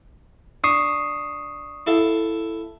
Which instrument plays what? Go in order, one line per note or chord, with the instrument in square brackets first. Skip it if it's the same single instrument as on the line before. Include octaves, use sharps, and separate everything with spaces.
[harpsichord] D4 [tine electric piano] C#6 D#6 C7
[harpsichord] E4 A4 F5